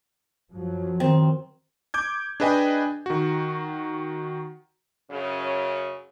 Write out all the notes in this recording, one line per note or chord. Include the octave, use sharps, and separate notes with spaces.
F#2 F3 F#3
D#3 C4
D6 G6 G#6
D4 G#4 B4 D#5 G5 G#5
D#3 F#4
F#2 C#3 C#5